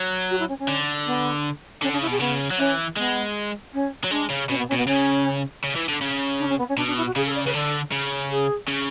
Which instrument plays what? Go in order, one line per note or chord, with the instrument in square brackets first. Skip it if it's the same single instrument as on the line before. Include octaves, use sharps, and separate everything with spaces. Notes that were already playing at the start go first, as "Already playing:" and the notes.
Already playing: [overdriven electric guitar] F#3
[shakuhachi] F#4
E4
C#4
C#4
[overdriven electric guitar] D3
[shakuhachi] B3
[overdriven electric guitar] D3 [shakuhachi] C#4
[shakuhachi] D4
[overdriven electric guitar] C#3
[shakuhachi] E4
[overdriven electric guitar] B2 [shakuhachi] G#4
[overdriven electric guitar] C#3 [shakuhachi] B3
[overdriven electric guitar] F#3
[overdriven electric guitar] E3 [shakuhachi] C#4
[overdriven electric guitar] G#3 [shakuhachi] B3
[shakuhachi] C#4
[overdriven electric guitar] F#3
[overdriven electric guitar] G#3 [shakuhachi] D4
[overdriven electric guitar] C#3
[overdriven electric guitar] B2 [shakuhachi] C#4
[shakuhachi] B3
C#4
[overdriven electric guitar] B2
[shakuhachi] B3
[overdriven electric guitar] C#3 [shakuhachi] C#4
[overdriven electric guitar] C#3
E3
D3
C#3
[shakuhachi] D4
C#4
B3
C#4
[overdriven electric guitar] B2 [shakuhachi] D4
[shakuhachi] D4
E4
F#4
[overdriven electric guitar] C#3 [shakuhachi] G#4
[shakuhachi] A4
D5
[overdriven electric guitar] C#3 [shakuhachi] B4
[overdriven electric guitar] D3 [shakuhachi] A4
[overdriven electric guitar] C#3
[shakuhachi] G#4
[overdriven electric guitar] C#3